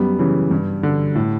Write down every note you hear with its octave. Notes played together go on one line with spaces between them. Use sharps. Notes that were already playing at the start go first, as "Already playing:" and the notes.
Already playing: F#2 G3 B3
C#3 E3
G2
D3
A2